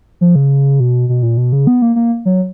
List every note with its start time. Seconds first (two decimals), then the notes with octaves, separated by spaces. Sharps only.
0.21 F3
0.35 C#3
0.80 B2
1.09 B2
1.23 A#2
1.37 B2
1.52 C#3
1.67 B3
1.82 A#3
1.96 A#3
2.25 F#3